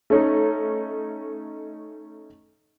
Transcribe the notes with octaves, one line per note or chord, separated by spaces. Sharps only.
A3 C#4 D#4